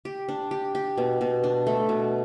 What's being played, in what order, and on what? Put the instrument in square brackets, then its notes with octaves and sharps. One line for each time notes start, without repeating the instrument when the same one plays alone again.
[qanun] G4
D4
G4
G4
B2
B2
D4
A3
B2